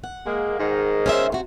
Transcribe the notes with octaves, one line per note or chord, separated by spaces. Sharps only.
F#5
G#3 A#3
G#2 D#3
C#4 C5 E5
C3 F#4